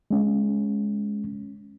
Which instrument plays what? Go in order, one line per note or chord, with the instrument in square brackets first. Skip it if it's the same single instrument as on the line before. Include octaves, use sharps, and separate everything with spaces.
[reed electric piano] G#3 C#4